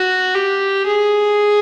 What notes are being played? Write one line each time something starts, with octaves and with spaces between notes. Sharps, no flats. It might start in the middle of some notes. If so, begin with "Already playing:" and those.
Already playing: F#4
G4
G#4